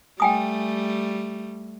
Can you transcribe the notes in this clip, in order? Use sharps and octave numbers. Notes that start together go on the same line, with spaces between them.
G3 A3 G5 G#5 D#6